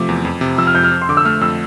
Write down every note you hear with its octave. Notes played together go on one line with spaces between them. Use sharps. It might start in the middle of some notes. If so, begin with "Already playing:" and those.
Already playing: C3 F3 A3 D6
E2
F2
C3
F3 E6
F6
F2 G6
F6
F2
C6
D3 D6
E6
A3 F6
F2 E6